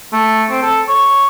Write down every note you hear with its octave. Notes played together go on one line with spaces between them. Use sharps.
A3
C4
A4
C#5